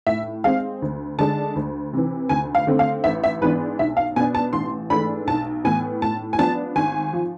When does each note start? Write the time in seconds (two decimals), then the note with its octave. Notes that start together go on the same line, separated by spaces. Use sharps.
0.07 A2 E5
0.44 G#3 C4 F5
0.82 D2
1.18 D3 G#3 D4 A5
1.56 D2
1.93 C3 E3
2.29 D2 G#5
2.55 F5
2.67 D3 A3 C4
2.79 F5
3.04 A1 E5
3.24 E5
3.41 G#2 E3 B3 D4 B4
3.79 B1 E5
3.97 F5
4.16 B2 B3 D4 G#5
4.35 A5
4.53 A1 C6
4.90 G#2 E3 A3 D4 B5
5.27 B1 A5
5.64 A2 E3 B3 G#5
6.02 A2 A5
6.33 G#5
6.38 F3 B3 D4 A5
6.76 G#1 G#5
7.13 F3